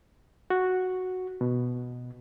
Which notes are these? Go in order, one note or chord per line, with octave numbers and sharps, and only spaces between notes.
F#4
B2